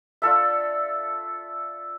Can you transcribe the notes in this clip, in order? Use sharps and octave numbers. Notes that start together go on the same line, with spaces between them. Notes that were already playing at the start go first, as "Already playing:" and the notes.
D4 F4 A4 E5